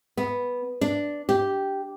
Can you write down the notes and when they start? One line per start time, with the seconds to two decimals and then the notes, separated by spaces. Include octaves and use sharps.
0.17 B3
0.81 D4
1.29 G4